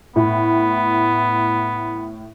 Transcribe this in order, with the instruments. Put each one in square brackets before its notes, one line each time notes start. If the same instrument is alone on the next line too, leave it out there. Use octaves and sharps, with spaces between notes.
[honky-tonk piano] A2 [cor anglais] B3